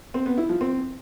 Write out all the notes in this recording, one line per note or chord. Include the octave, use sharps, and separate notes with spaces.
C4
B3
E4
F3
C4